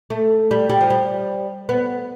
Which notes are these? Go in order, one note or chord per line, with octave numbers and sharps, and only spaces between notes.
A3
G3
G3
F3
G3
B3